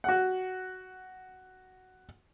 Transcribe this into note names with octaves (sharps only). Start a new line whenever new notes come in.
F#4 F#5